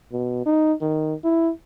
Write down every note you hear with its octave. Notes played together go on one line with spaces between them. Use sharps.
B2
D#4
D#3
E4